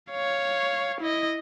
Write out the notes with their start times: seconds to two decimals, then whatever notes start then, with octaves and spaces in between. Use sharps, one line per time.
0.11 C#5 F5
1.01 E4 D#5